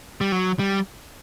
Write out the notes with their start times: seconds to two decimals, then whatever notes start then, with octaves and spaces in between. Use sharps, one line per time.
0.21 G3
0.32 F#3
0.59 G3